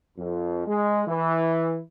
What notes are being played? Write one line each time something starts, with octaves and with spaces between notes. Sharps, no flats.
F2
G#3
E3